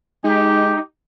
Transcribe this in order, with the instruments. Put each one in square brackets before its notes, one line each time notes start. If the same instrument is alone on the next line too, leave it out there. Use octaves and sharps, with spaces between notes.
[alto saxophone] G#3 [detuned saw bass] D#4 [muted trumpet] G4